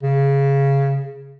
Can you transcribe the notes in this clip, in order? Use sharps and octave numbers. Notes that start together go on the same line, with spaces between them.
C#3